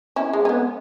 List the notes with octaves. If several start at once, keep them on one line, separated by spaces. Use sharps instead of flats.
C#4 E4
G#3
C#4
B3